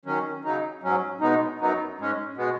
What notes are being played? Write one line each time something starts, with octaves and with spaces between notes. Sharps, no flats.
D#3 F#3 C#4
C#3 F#3 D#4
G#2 F#3 C#4
B2 G#3 B3 D#4
F#2 F#3 B3 D#4
G#2 G#3 C#4
B2 G#3 B3